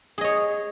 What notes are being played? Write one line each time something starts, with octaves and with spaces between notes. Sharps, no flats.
G#4 C#5 D#5